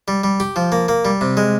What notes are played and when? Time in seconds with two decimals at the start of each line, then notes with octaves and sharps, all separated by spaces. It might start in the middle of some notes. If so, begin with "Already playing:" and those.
0.08 G3
0.24 G3
0.40 G4
0.56 F3
0.72 A#3
0.88 A#3
1.05 G3
1.21 C3
1.37 G#3